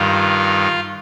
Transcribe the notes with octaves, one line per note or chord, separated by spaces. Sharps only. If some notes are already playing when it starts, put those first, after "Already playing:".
Already playing: G2 D#3 F4